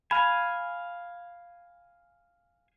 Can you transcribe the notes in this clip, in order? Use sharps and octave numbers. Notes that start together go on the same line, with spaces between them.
F5 G#5 B5